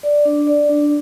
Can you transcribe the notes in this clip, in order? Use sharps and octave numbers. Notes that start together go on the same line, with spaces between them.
D5
D4
D5
D4